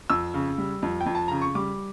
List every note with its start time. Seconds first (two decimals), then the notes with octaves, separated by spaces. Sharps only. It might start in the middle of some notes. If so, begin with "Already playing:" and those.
0.10 F2 E6
0.34 C#3
0.58 G3
0.82 F2
1.01 G5
1.06 F2
1.15 A5
1.28 C#3 A#5
1.42 C#6
1.55 G3 D6